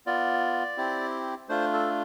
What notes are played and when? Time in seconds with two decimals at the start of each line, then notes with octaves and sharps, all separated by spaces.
0.06 B3 F4 D5
0.77 C4 E4 G4
1.49 A3 D4 F4 C5
1.73 A4